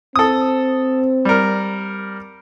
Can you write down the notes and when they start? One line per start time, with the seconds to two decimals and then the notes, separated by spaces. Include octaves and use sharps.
0.16 C4 A4 D#6
1.25 G3 A#4